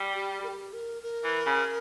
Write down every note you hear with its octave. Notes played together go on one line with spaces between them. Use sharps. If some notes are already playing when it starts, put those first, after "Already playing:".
Already playing: G3
G4
A#4
G4
A#4
A#4
E3
C#3